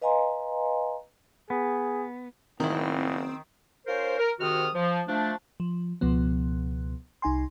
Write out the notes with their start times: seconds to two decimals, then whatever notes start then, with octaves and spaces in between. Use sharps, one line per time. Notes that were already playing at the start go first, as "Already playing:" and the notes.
0.02 B4 D#5 F5 G#5 A#5 C6
1.50 B3 G#4
2.60 F#1 A2 D#3 C4 E4
3.87 C#4 F4 A#4 C5
4.18 A#4
4.40 G#2 C3 D#3 F#4 D#6 F6
4.75 F3
5.08 F3 A3 D4
5.60 F3
6.01 C#2 B2 F3 B3
7.22 C2 D#4 G#5 C6